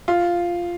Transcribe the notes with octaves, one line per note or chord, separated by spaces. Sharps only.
F4